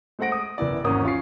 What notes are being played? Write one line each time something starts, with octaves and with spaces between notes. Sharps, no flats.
G#3 A3 C5 F#5 A#6 D7
D#6
F#1 B3 E4 D5
G#1 E2 A#3 C#4 D#6
C#4 F4 C#5 G#5 C7